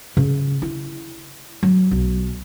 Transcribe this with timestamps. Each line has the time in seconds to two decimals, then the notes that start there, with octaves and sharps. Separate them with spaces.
0.17 C#3
0.62 E4
1.63 F#3
1.91 B1